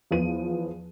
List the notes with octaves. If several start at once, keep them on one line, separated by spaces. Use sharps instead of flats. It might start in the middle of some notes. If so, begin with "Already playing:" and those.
E2 F3 B3 D#7